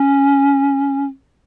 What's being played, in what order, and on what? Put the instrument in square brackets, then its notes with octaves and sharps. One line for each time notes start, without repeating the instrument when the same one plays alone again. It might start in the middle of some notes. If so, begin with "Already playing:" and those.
Already playing: [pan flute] C#4